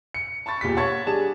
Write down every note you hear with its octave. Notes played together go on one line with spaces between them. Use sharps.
C#7
A5 B5 C#6 A6
E1 A#2 G4 B6
C#5 F#5 A5 C#6 G#6 A6
G3 D4 G4 G#4 A5 E7